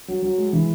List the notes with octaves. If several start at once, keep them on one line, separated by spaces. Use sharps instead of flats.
F#3
F#3
G#3
E3